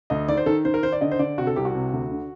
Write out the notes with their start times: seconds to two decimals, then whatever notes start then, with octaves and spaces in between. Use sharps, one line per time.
0.10 D2 D#5
0.28 D#3 D5
0.37 C5
0.46 D#3 A4
0.65 D#3 C5
0.74 A#4
0.83 D#3 C5
0.92 D5
1.01 D3 D#5
1.11 C5
1.19 D3 D5
1.38 C3 F#4
1.47 A4
1.56 C2 G4
1.65 F#4
1.75 C3
1.93 D2
2.11 D3